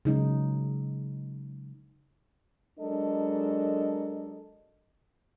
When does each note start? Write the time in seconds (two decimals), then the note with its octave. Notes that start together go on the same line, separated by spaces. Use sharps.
0.05 C#3 F#3 G#3 D#4
2.79 F#3 G#3 D4 A4 A#4 D#5